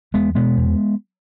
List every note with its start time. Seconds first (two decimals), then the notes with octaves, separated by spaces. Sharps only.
0.14 E2 G#3 B3
0.35 B2 G#3 B3
0.57 E2